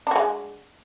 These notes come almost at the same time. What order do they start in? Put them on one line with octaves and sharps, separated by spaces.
D4 F#4 G#3